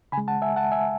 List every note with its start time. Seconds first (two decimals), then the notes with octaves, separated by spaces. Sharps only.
0.12 C#3 G#5 B5
0.18 G#3
0.28 F#5 A5
0.42 E5 G#5
0.56 F#5 A5
0.72 E5 G#5